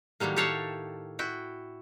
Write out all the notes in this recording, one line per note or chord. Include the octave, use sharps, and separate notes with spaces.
A2 D#3 F#3 G3 A#3
G4 A4 C#5 F5 F#5 A5
E4 F#4 G5